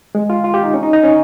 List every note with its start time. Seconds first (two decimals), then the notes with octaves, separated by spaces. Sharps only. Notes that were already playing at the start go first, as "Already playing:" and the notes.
0.15 G#3
0.30 F4
0.44 F4
0.54 G4
0.63 D#4
0.74 C#4
0.83 D#4
0.93 D#4
1.03 C#4